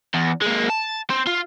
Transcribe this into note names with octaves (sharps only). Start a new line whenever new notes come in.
E2
G#3 A#3
A5
C4
F4